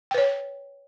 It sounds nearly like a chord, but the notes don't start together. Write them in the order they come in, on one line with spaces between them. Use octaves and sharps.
G5 B4 C#5